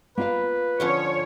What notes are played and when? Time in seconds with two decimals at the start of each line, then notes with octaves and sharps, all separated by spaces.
0.18 A#3 F4 B4 F5
0.80 D3 F3 C#4 C#5